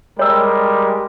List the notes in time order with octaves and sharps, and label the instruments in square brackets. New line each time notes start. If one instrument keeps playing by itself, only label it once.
[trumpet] G3 [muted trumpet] G#3 [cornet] A#4 [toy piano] C#5 E6